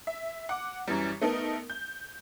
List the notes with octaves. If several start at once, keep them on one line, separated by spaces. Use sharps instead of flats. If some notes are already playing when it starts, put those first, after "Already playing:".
E5
F#5 D6
F#2 E3 G3
A3 B3 D#4 A4 A#4
G6